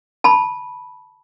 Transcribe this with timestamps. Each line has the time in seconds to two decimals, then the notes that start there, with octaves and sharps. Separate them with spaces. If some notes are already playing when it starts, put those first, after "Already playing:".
0.24 A5 B5